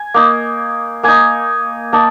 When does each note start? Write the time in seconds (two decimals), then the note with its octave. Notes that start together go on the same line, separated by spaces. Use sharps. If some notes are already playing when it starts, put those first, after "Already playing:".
Already playing: G#5
0.14 A#3 D#4
1.03 A#3 D#4 G#5
1.93 A#3 D#4 A5